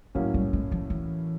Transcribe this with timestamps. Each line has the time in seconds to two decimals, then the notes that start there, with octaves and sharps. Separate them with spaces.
0.15 A2 F3 F#3 A#3 C#4
0.34 G3
0.53 G#3
0.72 F3
0.90 E3